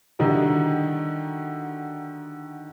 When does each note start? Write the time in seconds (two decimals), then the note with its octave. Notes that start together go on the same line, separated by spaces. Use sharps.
0.19 D3 D#3 G3 D#4 E4 F#4